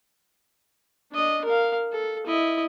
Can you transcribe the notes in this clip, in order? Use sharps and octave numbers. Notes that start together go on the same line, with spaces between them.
D4 D#5
A#4 F5
A4
E4 D#5